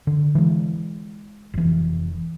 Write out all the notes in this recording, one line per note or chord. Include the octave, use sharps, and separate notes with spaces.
D3
E3 G#3
F1 E3